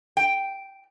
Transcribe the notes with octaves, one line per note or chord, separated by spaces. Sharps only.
G5